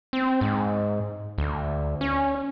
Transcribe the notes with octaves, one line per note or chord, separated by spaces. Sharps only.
C4
G#2
D2
C#4